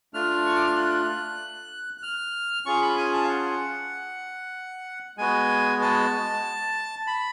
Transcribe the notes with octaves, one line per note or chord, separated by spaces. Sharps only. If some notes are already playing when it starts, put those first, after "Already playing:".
A3 D4 F4 F6
C#6
D6
F6
F#6
F#6
F6
C#4 F4 G#4 C#6
B5
G#5
A5
F5
F#5
G#3 B3 F#4 G#5
A5
B5